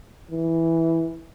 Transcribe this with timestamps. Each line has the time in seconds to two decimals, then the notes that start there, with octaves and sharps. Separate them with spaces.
0.31 E3